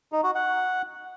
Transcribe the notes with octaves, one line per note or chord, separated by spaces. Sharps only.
D#4
F#4
F#5